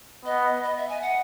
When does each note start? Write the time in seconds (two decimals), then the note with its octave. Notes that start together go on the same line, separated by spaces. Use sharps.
0.25 B3 D#5
0.63 D#5
0.77 E5
0.89 G#5
1.02 F#5